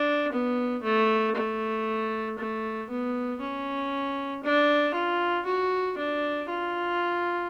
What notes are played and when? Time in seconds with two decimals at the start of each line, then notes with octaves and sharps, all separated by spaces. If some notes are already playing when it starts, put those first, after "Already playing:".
Already playing: D4
0.32 B3
0.83 A3
1.35 A3
2.38 A3
2.90 B3
3.40 C#4
4.44 D4
4.94 F4
5.46 F#4
5.98 D4
6.49 F4